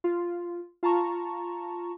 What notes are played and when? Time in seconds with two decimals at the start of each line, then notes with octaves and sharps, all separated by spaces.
0.04 F4
0.83 F4 A5 A#5 C#6